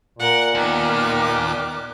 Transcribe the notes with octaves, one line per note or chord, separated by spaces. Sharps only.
A#2 A#4 F#5
D#2 D#3 B3 D6 F6 F#6